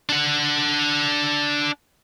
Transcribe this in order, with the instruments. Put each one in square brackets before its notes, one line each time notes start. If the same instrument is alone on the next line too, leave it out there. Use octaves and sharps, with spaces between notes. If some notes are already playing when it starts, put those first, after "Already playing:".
[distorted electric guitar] D4 F#5